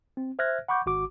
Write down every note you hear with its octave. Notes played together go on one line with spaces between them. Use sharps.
C4
C5 E5 F6 F#6 G#6 A#6
F#5 B5 C#6 D6 G6
G#1 F#4 D6